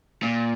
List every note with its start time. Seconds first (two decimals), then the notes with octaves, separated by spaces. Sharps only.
0.23 A#2